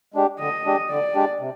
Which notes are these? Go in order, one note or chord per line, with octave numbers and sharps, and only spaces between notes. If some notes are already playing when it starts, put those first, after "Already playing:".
G#3 D4 G4
D3 D#5
G#3 D4 G4
D3 D5
G#3 D4 G4
C3